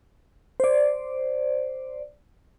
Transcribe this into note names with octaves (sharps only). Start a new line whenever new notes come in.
C5 D5